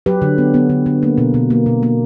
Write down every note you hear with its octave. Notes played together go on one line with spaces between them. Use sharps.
F#3 G4 B4
D3
B3
B3
D3
D3
A#3
B2
B2
A#3
B2
A#3